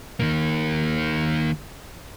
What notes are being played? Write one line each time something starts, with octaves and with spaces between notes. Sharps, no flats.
D#3 A#3